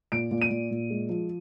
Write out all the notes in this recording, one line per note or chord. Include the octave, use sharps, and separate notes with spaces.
A#2 D7
A#2
D#7
A#2
A#2
G#3
F3